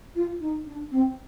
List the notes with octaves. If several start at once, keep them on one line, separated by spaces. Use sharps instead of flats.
F4
D#4
D4
C4